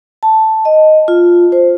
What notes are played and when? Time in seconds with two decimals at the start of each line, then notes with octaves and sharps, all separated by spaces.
0.23 A5
0.65 D#5
1.08 F4
1.52 C5